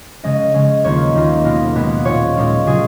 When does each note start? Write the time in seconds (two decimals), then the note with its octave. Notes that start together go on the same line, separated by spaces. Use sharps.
0.23 C#3 G#3 C#4 D#5
0.54 C#3 G#3 C#4
0.84 D#2 D#3 A#3 F4 C#5
1.15 D#2 D#3 A#3 F4
1.45 B2 G#3 B3 F4 A#4
1.75 B2 G#3 B3 F4
2.05 A#2 G#3 C#4 F4 C#5
2.36 A#2 G#3 C#4 F4
2.66 C#3 F#3 C#4 F4 G#4